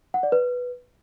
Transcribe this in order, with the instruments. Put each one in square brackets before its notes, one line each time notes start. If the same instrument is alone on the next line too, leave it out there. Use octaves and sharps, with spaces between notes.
[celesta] F#5
D5
B4